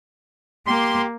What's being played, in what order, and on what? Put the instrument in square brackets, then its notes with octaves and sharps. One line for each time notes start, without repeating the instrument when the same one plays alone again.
[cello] A#3 [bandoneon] G4 [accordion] C6